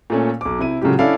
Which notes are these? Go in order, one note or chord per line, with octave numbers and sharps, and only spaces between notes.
A#2 A3 C#4
B1 D6
C3 E4 D#7
A2 C#3 F#3 G#3 F4 G4
C#4 D4 E4 A4 D5 F5